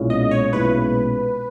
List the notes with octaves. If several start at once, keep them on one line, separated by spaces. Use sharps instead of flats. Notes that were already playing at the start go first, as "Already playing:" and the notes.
Already playing: B1 A#2 G#3 C#4 E4
D#5
C#5
B1 A#2 G#3 C#4 E4 B4